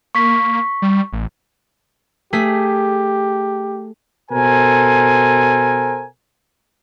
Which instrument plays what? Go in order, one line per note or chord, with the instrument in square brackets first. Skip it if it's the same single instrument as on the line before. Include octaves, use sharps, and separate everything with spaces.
[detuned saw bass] A#3 [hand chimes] C#6 B6
[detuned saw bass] G3
A1
[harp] A3 G#4 B6 [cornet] G4
[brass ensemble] B2 A4 A#4 C5 G#5